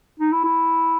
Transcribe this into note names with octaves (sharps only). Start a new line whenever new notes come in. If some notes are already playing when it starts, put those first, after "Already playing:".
D#4
E4
E4